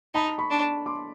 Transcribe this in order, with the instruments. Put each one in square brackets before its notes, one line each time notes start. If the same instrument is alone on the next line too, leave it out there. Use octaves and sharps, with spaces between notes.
[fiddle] D#4 [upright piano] A5 B5
[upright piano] B5 C#6
[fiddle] D4
[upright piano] C6 D6